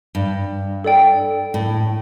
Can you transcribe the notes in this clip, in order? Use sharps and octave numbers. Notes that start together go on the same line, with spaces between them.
G2
A4 D5 G5
A2